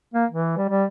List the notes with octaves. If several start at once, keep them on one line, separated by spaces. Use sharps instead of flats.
A#3
E3
G3
G3